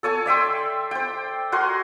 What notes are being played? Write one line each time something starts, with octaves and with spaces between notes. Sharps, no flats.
A4 C#5 G#5 A5
D5 E5 G5 C6
C5 G5
F#4 A#4 G#5 C6